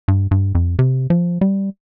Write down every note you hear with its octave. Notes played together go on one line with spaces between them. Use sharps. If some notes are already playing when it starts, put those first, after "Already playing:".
G2
G2
F2
C3
F3
G3